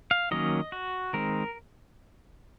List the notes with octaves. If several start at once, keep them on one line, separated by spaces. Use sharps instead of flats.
F5
D#3 F#3 A#3 C#4 D#5
F#4
D#3 G#3 C4 A#4